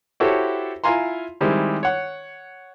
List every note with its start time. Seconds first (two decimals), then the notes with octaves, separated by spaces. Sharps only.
0.20 E4 F#4 G4 A4 C5 C#5
0.84 E4 F4 F5 G#5 A#5 C6
1.41 D#3 G3 G#3 C4 E4
1.83 C#5 F#5